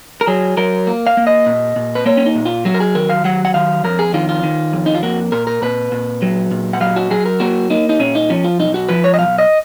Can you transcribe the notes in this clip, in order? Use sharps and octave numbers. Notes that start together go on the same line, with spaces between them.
A#4
F#3 G#4
F#3 A#4
A#3
F5
A#3
D#5
A#2
A#2
B4
A#3 C#5
C#4
D#4
A#2
F4
F#3 F#4
A#4
G#4
D#3 A#4
F5
F#3 F#5
F#5
D#3 F5
F2 A#4
G#4
D#3 F4
F4
D#3
F2
D#4
F4
A#3 F#4
A#2 A#4
A#4
A#2 B4
A#2
F#3
A#2
F#5
F#3 F5
F#4
F#3 G#4
A#4
A#3 F#4
A#3 D#4
D#4
A#2 C#4
D#4
F3 C#4
F4
B1 D#4
F#4
F3 B4
C#5
D#5
B1 F5
D#5